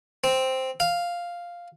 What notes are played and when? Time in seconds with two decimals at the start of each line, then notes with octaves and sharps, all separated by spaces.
0.24 C4
0.80 F5